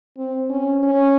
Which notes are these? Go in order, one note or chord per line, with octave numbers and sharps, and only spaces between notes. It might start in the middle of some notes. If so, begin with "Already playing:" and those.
C4
C#4
C#4